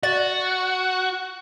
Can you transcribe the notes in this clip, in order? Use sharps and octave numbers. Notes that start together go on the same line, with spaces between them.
F#4 D5 A6